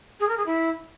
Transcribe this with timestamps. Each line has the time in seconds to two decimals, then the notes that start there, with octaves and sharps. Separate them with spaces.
0.20 G#4
0.29 A#4
0.38 G#4
0.46 E4